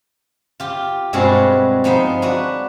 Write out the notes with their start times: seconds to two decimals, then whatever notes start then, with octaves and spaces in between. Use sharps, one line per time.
0.60 F4 G4
1.13 G2 B2 G#3 C4 F4 F#4
1.84 F3 B3 D#4 C5
2.22 D4 F#4 B4